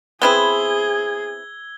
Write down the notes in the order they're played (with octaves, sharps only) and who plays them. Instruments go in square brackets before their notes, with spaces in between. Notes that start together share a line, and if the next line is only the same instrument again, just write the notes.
[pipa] B3 C4 E4 [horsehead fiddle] G#4 [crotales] E6 G#6 G7